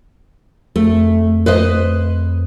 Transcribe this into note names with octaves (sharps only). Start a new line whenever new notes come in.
F2 A3
B4 C5 D#5